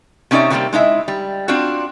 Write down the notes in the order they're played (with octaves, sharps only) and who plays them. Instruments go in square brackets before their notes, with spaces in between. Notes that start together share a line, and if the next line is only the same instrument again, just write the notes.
[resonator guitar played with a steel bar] C3 C#4 D#4 C#5 D5 E5
C3 E3 F#3 G3 A#3 C4
G#3 D#4 E4 E5
G3
C4 D4 F4 F#4